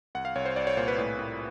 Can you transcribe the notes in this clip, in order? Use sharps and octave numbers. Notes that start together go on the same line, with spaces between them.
C2 F#5
F5
C2 C#5
C5
C2 D5
C#5
A#2 C5
B4
A2
A2